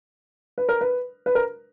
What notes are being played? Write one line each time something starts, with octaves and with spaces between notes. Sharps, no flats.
B4
A#4
B4
B4
A#4